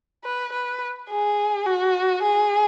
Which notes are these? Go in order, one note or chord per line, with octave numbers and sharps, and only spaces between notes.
B4
B4
G#4
F#4
G#4